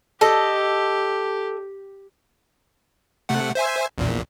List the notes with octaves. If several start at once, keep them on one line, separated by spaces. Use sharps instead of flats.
G4 A4 D#5
C3 A3 F#5
C5 E5 G#5
A#1 E2 A#2